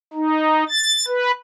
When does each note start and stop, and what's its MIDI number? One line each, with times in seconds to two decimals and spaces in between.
0.13 0.64 63
0.69 1.05 93
1.08 1.32 71